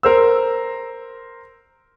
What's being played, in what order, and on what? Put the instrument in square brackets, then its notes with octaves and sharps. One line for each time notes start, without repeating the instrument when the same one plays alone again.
[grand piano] A#4 C5 E6